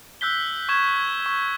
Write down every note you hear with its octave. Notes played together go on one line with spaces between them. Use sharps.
E6 F#6 G6 B6 G7
C#6 G#6 E7
G#6
C#6